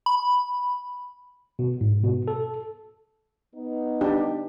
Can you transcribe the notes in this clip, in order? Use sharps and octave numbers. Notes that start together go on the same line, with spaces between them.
B5
B2
G#2
B2
A4
B3 D#4
D4 G4